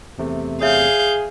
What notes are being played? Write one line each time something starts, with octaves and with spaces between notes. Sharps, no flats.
E2 C3 A3
G#4 C#5 E5 F5 G6